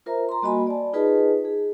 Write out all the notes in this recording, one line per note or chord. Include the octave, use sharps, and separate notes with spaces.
F4 A#4 C5 E5 A#5
A#5 C6
G3 A#3 F#4 D#5 G#5 B5
D5 A5
D#4 F4 G#4 B4 D#5 A5
G#4